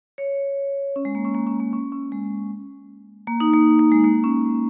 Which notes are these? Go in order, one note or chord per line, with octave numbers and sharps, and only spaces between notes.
C#5
C#4
G#3
A#3
C#4
A#3
C#4
A#3
C#4
C#4
G#3
A#3
D#4
A#3
A#3
G#3
A#3
C#4